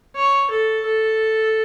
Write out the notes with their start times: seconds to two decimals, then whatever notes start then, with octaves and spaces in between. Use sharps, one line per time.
0.16 C#5
0.50 A4
0.86 A4